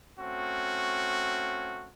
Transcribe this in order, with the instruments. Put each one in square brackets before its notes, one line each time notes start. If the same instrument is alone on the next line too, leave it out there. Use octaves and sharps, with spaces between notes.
[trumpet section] A3 C4 C#4 F#4